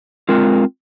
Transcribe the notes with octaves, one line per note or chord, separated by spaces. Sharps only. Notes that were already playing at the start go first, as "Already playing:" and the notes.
G#3 C4 F4 A#4